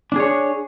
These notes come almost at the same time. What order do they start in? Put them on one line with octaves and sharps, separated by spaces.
D4 G#4 C#5